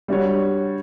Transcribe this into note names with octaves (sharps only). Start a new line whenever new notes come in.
G3 D4 F#4 C#5